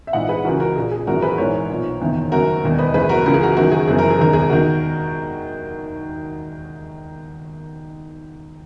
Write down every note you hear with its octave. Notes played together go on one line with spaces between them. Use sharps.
E5
A#1 G#2 E3 D#5 F#5
G#4 B4
C#2 C#3 E3 F#4 A#4
F#4 A#4
A#1 A#2 G#4
G#4
G#1 F#2 E3 F#4 A#4
G#4 B4
A#1 G#2 E3 A#4 C#5
B1 A#2
F#1 E2 D#3
F#1 F#2 D#3 F#4 A#4
E1 D#2 D#3
B4 D#5
F#1 F#2 E3 G#4 B4
F#4 A#4
C#2 C#3 E3 A#4
G#4
F#4 A#4
F#1 F#2 D#3 F#4 A#4
G#4
F#1 F#2 E3 G#4
A#4
G#4
E1 D#2 D#3 A#4
G#4
D#3 F#4 A#4